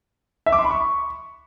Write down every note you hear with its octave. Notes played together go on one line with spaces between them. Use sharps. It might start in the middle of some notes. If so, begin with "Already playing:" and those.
E5
D6
C6
B5
C#6